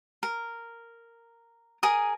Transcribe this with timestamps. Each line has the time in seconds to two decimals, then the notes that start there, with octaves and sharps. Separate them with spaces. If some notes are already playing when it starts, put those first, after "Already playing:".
0.23 A#4
1.83 G#4 A#4 D#6